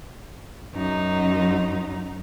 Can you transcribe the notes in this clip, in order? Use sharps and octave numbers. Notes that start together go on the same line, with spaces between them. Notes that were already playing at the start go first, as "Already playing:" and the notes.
F#2 D#4